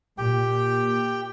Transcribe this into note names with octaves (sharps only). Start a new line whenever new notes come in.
A#2 G4 G5